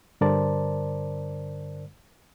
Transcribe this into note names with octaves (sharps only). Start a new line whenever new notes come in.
G2 D3 A#4 C5 D5 A5